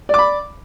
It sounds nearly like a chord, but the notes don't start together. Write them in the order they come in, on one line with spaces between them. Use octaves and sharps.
D5 D6 B5